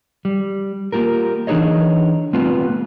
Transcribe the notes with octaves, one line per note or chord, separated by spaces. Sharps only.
G3
A#3 F4 G4 A#4
E3 D4 D#4 G#4 C#5 D#5
G3 A3 B3 C4 F4